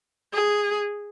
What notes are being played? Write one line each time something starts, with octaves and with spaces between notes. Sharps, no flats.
G#4